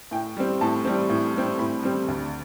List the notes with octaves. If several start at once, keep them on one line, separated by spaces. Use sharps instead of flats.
A2 G5
G3 C4
A2 A5
G3 C4
A2
G3 C4
A2 B5
G3 C4
D2